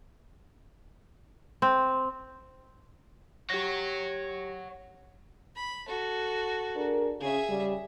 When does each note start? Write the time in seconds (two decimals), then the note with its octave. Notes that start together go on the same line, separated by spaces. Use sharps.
1.62 C4
3.50 G4 C#5 F#5 A#6
5.56 B5
5.88 F#4 A4
6.76 D4 G#4 A#4
7.21 C#3 G#4 E5
7.49 C#3 G3